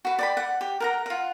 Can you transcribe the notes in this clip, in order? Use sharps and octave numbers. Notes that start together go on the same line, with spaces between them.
F#4 B4
D5 G5 B5
F#5
G4
A#4 F#5 A#5
F4 F#5